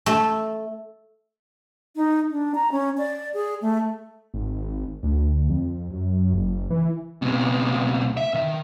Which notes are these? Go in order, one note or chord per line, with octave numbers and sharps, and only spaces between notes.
A3
D#4
D4
A#5
C#4
D5
G#4
A3
G#1
D2
F2
F#2
F#1
E3
C#2 B2
E5
D#3